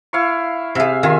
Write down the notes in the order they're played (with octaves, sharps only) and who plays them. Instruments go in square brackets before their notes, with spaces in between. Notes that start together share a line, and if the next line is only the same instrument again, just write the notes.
[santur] E4 F5 C#6
[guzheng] C3 G#4 [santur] E5 F5
[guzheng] D#3 [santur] F4 E5 G#5